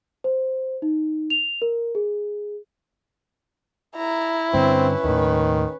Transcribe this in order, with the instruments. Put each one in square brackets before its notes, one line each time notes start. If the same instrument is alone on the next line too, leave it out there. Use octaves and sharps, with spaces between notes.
[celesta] C5
D#4
F7
A#4
G#4
[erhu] E4 [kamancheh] A#5
[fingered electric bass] G2 D3 [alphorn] C4 [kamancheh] C#4 B4
[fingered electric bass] D#2 A2 [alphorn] D#3